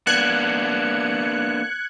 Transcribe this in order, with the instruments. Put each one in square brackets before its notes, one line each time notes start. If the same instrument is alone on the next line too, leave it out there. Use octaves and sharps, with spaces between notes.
[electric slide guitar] A#3 B3 D4 [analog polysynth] F#6 G#6 C#7